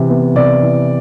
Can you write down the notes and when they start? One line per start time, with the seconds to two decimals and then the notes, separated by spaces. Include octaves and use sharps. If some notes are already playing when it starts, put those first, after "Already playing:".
Already playing: C3 E3
0.09 B3
0.35 C3 D5
0.62 E3